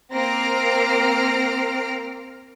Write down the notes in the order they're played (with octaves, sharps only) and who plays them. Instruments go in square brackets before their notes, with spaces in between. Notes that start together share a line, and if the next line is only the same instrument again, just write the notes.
[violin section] A#3 C4 F6 A#6 C7 D7